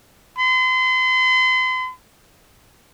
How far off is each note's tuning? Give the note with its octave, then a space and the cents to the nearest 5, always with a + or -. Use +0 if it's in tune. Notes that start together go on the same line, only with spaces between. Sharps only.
C6 -40